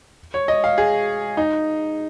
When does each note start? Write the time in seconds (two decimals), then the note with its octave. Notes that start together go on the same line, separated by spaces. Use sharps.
0.34 C#5
0.48 D#5
0.64 F5
0.78 G#4
1.37 D#4